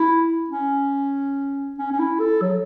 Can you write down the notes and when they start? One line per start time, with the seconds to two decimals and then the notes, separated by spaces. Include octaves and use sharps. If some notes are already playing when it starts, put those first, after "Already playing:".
Already playing: E4
0.50 C#4
1.78 C#4
1.92 C#4
1.99 E4
2.20 A4
2.42 F#3